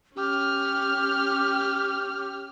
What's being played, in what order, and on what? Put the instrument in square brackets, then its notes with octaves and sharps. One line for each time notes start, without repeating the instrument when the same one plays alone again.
[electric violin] C#4 F6 [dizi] G4